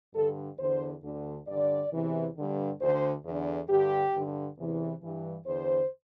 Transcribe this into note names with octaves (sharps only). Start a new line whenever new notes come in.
G2 D3 A4
E2 D3 C5
D2 D3
G2 D3 D5
E2 C3 E3
G2 D3
D2 D3 C5
E2 D3
G2 D3 G4
G2 D3
E2 C3 E3
G2 E3
E2 D3 C5